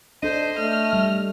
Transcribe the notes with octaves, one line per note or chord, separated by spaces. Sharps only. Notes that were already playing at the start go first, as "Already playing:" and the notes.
D4 A4 C5 D#5
A3 F6
G3